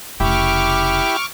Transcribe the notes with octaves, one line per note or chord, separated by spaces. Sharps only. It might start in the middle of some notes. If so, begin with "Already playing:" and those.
F1 C#3 E4 G4 C#6 D6 F6